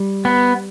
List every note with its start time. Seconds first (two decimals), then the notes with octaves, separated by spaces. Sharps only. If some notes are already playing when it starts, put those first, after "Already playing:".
Already playing: G3
0.25 B3